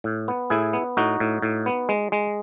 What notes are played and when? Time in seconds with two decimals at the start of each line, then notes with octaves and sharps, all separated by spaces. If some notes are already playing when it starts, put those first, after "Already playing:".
0.04 A2
0.28 B3
0.50 A2 E4 G#4
0.73 B3
0.97 A2 D#4 F#4
1.20 A2
1.42 A2
1.66 B3
1.89 G#3
2.12 G#3